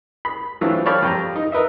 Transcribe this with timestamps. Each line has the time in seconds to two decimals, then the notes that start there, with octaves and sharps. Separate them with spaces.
0.25 B5
0.61 E3 F#3 A3 C4 D4 F4
0.86 C#5 D5 F5 G5 A5 B5
1.02 F2 G4 A#5
1.36 D#4
1.52 A#4 B4 D#5 E5